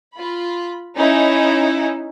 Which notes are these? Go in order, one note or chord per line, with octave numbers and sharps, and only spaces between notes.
F4 B5
C#4 D#4 E4